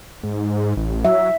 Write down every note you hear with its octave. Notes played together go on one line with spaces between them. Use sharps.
G#2
A1
F#3 E5